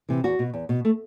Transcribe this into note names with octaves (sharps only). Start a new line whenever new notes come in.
C3 E3
E2 F#4
B2
E2
B2
A3